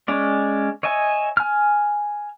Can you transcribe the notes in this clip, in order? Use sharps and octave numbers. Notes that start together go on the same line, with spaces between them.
G#3 C#4 D5
C#5 D#5 E5 G#5
G#5 F6